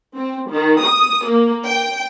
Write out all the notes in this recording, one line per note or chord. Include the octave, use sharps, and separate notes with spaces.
C4
D#3
D#6
A#3
G5